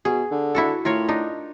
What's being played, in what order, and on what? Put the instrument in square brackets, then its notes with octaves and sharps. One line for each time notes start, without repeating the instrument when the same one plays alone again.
[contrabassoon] B2 [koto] G#4
[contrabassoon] D3
[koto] E4 F#4 A4
[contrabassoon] A2 [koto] F4 A#4 C#5
[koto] D4 D#4